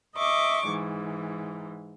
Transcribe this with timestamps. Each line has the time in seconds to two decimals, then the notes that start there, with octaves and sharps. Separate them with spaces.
0.16 D#5 E5 C#6 D6
0.68 G#2 E3